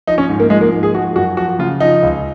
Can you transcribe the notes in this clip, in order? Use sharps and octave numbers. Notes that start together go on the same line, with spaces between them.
F3 D#4
C#4
G#2
A#3
F3 G#3
A#3
G#2
G#4
F3 F#4
F#2 F#4
F3 F#4
C#3 F4
F3 D#4
C#2